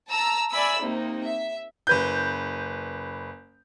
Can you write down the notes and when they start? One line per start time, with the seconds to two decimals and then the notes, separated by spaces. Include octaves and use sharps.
0.11 A5 A#5 E6
0.51 D5 E5 G#5 B5 E6
0.81 C3 A#3 D#4
1.26 E5
1.87 F#1 B4 G6